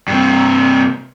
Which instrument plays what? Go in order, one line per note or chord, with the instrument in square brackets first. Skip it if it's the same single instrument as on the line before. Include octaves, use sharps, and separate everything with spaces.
[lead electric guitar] G2 C3